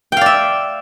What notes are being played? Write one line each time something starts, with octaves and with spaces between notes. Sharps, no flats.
D5 E5 F5 G5